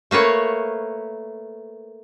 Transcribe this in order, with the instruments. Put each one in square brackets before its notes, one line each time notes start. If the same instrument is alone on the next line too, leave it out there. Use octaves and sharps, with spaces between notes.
[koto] A3 A#3 B4 C#5